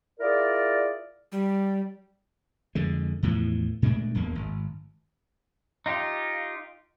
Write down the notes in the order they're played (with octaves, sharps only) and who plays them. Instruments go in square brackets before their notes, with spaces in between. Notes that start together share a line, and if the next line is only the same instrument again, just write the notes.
[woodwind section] E4 F4 G#4 A#4 D5
[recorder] G3
[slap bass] F2 D3 G#3
E2 A2 E3 F3
A#2 G#3 A3 D4
D#1 E2 A#3
G#1
[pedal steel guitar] D#4 F4 G4